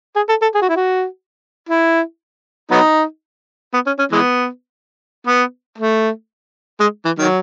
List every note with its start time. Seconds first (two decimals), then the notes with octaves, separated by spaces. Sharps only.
0.16 G#4
0.29 A4
0.42 A4
0.55 G#4
0.61 F#4
0.69 E4
0.76 F#4
1.69 E4
2.71 F#3 B3 D#4
3.74 B3
3.87 C#4
3.99 C#4
4.12 E3 G#3 B3
5.27 B3
5.78 A3
6.80 G#3
7.05 E3
7.19 D#3 F#3